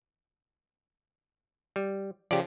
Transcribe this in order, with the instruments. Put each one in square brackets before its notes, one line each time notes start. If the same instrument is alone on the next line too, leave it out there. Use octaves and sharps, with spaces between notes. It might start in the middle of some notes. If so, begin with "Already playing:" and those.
[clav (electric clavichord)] G3
[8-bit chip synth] C#3 F3 [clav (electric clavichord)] G4 D5